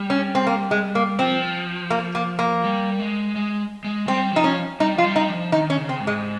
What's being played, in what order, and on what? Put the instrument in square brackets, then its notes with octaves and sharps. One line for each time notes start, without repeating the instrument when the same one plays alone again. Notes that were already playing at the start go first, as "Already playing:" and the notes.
Already playing: [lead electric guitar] G3
[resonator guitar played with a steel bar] C#4
C4
A#3
G#3
A#3
[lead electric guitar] F3 [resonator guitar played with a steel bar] C4
[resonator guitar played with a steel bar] A#3
A#3
A#3
[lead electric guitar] G3
G#3
G#3
G#3
[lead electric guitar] G3 [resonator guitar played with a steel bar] C4
[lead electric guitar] F3 [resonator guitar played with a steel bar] D#4
[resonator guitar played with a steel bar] C#4
[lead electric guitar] G3 [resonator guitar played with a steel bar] D#4
[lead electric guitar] F3 [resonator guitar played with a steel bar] F4
[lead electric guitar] G3
[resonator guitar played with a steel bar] D#4
[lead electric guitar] F3
[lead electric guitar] D#3 [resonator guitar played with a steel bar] D#4
[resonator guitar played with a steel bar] C#4
[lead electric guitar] C#3
[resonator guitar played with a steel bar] C4
[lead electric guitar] G#2
[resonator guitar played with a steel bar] G#3